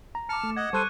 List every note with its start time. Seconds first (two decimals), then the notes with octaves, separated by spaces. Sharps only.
0.15 A#5
0.29 A5 D6 F6 C#7
0.44 A3
0.57 D#5 F#5 G#6
0.73 G3 A4 C5 C#6 F#6 D#7